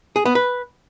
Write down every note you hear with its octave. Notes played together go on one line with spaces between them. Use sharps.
G#4
B3
B4